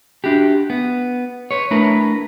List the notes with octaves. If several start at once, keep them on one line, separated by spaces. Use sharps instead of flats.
D4 E4 F#4 G4
B3
B4 C#5
A3 D4 E4 A#4 B4